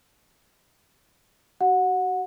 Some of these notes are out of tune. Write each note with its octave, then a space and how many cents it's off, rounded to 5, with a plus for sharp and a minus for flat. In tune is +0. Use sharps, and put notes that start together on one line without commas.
F#4 +35 F#5 -20